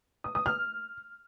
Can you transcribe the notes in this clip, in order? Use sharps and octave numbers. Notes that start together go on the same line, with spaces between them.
D#6
D#6
F6